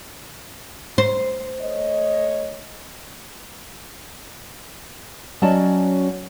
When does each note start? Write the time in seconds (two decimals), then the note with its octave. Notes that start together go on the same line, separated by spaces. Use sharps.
0.98 C5
1.60 A3 C#5 D#5
5.42 F#3 C#4 F#4 D5 D#5 A5